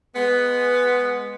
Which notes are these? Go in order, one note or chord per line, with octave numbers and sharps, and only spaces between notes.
G#3 B3